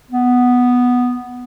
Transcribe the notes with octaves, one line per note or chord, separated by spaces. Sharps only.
B3